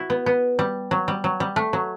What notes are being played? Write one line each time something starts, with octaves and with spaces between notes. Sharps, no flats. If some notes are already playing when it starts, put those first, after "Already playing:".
Already playing: E4 F#4
B3
B3
G3
F#3
G3
F#3
G3
A3
F#3